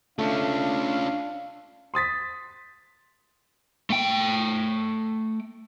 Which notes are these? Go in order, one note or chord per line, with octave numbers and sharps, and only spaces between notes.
A3 C#4 D4 F4 F5
C6 D#6 A6 B6
A3 G5